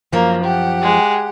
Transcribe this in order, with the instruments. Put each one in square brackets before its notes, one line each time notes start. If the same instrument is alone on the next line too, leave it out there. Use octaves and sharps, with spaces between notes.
[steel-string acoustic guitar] F#2 F3 [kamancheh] A#3
[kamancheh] G4 F#5
[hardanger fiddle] G#3